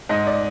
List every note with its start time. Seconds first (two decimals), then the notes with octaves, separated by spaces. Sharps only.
0.09 G#2 D#5
0.27 D5